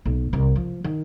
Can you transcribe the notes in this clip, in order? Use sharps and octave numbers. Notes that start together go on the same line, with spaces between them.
B1
C2
F3
D#3